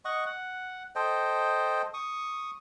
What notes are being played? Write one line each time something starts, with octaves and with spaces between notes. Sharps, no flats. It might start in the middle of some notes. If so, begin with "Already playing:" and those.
D#5 F#5 C#6
F#5
A4 C5 D#5 G5
C#6 D#6